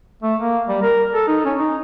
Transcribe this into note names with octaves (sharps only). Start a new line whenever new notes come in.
A3
A#3
G3
A#4
A4
D#4
C#4
D#4